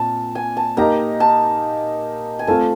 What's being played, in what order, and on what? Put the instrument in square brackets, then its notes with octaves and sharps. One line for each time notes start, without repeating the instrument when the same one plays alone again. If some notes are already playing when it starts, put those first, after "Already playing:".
Already playing: [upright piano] A#2 C4 [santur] A5
[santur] G#5
A5
[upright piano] A#3 D#4 G4 [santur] A#5
[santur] A5
G#5
[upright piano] A3 C4 F4 [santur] A5